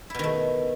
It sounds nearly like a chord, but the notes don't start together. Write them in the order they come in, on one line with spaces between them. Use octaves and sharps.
E4 B2 D#3 A3